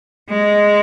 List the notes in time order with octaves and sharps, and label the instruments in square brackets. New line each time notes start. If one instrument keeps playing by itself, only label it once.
[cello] G#3